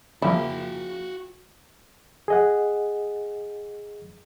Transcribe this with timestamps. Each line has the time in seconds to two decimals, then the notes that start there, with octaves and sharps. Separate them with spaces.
0.22 C#3 F3 A#3 E4 F#4 G5
2.28 G#4 D#5 F#5